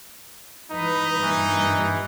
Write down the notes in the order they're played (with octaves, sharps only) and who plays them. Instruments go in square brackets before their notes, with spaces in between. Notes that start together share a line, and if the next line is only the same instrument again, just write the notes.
[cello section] E3 B4 [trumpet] D#4
[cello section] G2 A#2 [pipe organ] E3